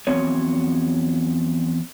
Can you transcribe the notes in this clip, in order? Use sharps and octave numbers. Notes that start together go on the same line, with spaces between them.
E2 F3 F#3 C4 C#5